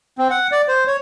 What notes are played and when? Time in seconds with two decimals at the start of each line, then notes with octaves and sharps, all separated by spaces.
0.18 C4
0.30 F#5
0.52 D5
0.68 C5
0.87 C#5